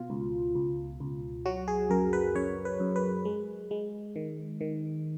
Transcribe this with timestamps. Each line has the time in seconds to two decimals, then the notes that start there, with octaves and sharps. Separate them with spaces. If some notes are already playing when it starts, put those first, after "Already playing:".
Already playing: B2 F4
0.10 C#2
0.55 C#2
1.00 C#2
1.46 F#3 F#4
1.68 G#4
1.90 F#2 A#4
2.13 B4
2.35 F#2 C#5
2.65 B4
2.80 F#2
2.96 B4
3.25 G#3
3.71 G#3
4.16 D#3
4.61 D#3